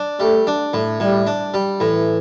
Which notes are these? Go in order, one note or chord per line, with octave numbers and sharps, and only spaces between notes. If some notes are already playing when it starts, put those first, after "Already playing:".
Already playing: D4
G3 A3
D4
A2
A2 G3
D4
G3
A2 E3